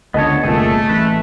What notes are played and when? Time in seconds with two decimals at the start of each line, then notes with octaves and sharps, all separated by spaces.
0.14 C#2 D3 B3 C#5 D#5 A5
0.44 G1 C2 A#2 A3 G#4 A4
0.89 A1 B4